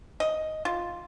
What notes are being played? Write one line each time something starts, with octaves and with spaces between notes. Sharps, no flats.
D#5
F4